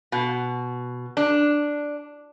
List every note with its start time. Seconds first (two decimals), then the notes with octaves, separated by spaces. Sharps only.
0.12 B2
1.17 D4